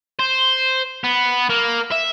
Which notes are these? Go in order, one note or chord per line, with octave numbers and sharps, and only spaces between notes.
C5
B3
A#3
E5